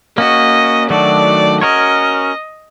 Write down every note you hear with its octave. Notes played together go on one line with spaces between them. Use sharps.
A#3 C#4 F#4 D#5
D#3 F#3 A3 D4 F#4 D5
C#4 F#4 A#4 C#5 D#5